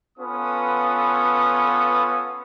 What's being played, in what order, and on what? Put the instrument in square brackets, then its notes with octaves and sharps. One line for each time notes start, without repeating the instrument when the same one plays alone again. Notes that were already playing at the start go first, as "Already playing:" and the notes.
[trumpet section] B3 C#4 F4 A4 B4 D#6